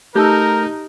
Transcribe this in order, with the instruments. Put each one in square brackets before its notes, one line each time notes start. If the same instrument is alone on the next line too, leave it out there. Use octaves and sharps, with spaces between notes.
[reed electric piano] A3 G6 [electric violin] D#4 [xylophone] G4 A5 E6 [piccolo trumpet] A#4